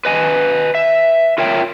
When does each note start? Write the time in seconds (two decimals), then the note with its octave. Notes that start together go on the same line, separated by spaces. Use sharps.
0.05 B4 D#5 G#5
0.75 E5
1.38 F4 A#4 C#5 E5 G5